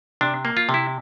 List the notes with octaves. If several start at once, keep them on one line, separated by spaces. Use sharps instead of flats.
C3 D4
A#3
F4
C3
E4